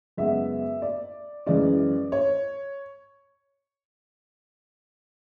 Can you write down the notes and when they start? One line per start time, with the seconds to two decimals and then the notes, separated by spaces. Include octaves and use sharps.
0.17 F#2 C#3 G#3 B3 E5
0.82 D5
1.46 F#2 E3 G#3 C#4 D5
2.12 C#5